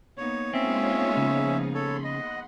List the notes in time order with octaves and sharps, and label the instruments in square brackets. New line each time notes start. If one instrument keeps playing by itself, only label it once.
[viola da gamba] A#3 B3 D#4 [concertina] C#5
[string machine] G#3 F4 C#5 [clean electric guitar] C4 [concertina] C#4 E5
[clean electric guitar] C#3 [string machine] F3 G#4
[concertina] A4 C#5 [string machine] B5 C6
[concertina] D#5 [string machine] F#5